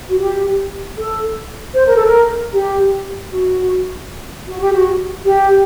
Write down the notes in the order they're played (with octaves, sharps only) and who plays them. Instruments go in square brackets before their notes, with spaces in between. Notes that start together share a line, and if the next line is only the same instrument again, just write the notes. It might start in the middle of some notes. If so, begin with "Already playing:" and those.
[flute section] F#4
G4
A4
C5
A#4
A4
A#4
G4
F#4
F#4
G4
F#4
G4